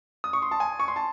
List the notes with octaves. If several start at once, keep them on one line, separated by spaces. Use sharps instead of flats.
D#6
C#6
C6
A5
G#5
C#6
C6
A5